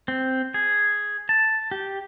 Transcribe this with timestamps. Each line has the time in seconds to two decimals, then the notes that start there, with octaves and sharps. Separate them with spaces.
0.08 C4
0.54 G#4
1.29 A5
1.71 G4